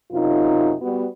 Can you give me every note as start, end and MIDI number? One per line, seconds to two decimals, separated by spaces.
0.12 0.72 42
0.12 0.72 48
0.12 0.72 63
0.12 0.72 65
0.82 1.06 55
0.82 1.06 59
0.82 1.06 66